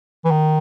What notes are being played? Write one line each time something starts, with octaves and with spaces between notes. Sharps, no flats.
E3
D#3